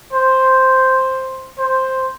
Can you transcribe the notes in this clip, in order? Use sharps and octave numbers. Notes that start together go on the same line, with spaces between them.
C5
C5